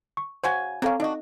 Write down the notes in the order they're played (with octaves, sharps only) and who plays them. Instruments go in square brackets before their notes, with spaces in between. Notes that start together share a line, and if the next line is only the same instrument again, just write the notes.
[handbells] C#6
[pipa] C#3 F#4 G#5 [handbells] C5
[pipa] A#3 C#4 [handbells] C4 A4 F5
[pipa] D4 F#4 [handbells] D#4 D#5